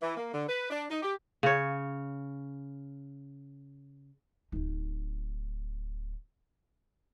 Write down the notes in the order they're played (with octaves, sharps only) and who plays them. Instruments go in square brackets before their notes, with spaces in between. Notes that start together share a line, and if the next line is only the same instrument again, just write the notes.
[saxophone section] E3
A#3
D3
B4
D4
D#4
G4
[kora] C#3 C#5
[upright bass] D1 D#4